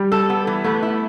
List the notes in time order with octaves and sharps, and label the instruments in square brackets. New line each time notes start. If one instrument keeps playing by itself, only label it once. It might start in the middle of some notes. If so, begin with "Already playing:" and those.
Already playing: [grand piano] G3
[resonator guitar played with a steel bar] A4
B3
E3
[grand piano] A3 [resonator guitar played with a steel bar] B3
[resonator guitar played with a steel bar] E4